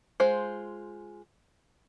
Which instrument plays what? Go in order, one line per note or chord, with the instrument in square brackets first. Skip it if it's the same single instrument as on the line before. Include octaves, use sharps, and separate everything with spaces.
[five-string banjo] G#3 F4 C5